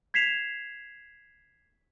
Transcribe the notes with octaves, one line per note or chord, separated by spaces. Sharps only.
G#6 B6 C7 E7 F7